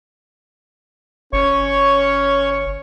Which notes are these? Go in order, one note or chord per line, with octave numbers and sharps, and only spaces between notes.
G1 C#4 C#5 C#6